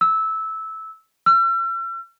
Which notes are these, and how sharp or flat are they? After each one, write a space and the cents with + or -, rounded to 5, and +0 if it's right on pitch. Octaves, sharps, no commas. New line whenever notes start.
E6 -15
E6 +45